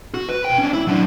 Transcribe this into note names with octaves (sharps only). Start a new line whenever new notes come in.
F#4
B4
B2 G5
C#4 D4
E4
F#3 D4